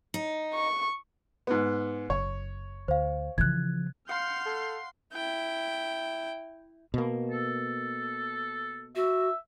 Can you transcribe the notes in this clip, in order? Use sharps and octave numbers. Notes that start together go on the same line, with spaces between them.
D#4
C#6
G#2 B3
F#1 C#5
D2 C5 F5
C#3 E3 F3 F#6 G#6
F5 F#5 C6 F6 G6
A4
E4 G5
B2 A#3
A4
F#4 E5